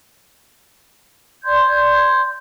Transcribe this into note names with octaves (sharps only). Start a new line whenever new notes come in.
D5 C6 G6 G#6